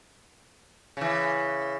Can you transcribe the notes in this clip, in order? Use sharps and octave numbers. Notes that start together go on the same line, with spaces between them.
C#3 E3